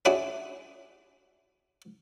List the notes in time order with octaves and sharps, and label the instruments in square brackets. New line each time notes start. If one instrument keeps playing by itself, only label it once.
[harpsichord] C#4 D4 E4 F#4 G#4